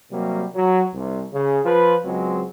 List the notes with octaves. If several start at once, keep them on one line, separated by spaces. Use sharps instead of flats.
C3 F#3 G3 A#3
F#3
C2
C#3
F3 F4 B4
C#2 F#3 G#3 C4